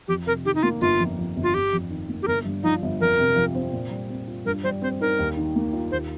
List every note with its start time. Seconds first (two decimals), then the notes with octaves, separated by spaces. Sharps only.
0.08 F2 G4
0.27 C3 A#4
0.45 D#3 G4
0.55 D#4
0.63 A#3 F4
0.81 G1 F4
1.00 F2
1.18 F3
1.36 G1
1.43 F4
1.54 G1 G4
1.73 F2
1.91 D#3
2.09 A#3
2.22 G4
2.27 G1 A#4
2.45 G2
2.63 F3 D#4
2.82 G1
3.00 F2 A#4
3.19 C3
3.36 F3
3.55 C4
3.73 A#2
3.91 G3
4.10 C4
4.27 F4
4.46 G2 A#4
4.64 G3 C5
4.82 C4 C5
5.01 D#4 A#4
5.19 D#2
5.37 D#3
5.56 A#3
5.73 F4
5.91 D#2 C5